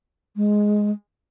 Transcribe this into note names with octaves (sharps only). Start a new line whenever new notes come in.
G#3